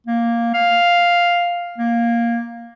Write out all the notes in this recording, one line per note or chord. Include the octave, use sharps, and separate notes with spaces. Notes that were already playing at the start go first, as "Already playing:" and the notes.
A#3
F5
A#3